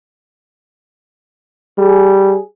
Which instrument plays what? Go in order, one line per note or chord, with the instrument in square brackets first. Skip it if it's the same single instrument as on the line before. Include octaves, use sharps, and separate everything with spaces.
[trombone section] G3 G#4